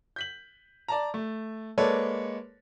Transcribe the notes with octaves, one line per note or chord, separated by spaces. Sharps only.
G6 B6 F#7
D5 A5 A#5
A3
G#3 A#3 A4 B4 C#5 D5